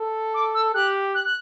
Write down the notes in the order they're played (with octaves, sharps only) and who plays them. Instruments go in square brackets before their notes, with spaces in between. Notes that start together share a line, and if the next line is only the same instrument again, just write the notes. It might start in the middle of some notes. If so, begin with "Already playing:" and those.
Already playing: [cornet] A4
[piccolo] D6
E6
[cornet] G4 [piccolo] F#6
[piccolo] F#6
F#6